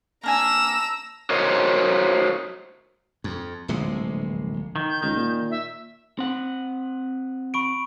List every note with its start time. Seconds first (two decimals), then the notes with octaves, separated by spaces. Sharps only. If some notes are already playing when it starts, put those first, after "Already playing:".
0.23 A#3 D4 G#5 A#5 E6
1.30 F#4 A#4 C5 C#5 D#5
3.24 F2
3.68 D1 A#1 C3 G#3
4.76 D#3
4.89 G6
5.03 C#2 D#3
5.15 A#2
5.50 E5
6.19 C4 F#5
7.54 B5 C#6 D7